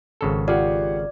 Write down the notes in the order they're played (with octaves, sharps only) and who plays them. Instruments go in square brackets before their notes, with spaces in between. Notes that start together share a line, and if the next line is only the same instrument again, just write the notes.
[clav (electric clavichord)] G#1 C#3 A4
[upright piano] F4 G4 F#5 [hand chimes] D5